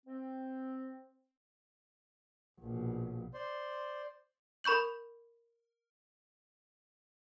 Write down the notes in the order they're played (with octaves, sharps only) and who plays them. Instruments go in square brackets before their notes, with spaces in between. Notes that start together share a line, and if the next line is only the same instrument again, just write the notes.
[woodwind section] C4
[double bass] A#1 B2
[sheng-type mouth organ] C5 D5 C6
[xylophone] A#4 B5 C#6 G6 F#7